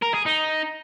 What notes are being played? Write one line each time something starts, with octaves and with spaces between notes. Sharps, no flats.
A#4
G#4
D#4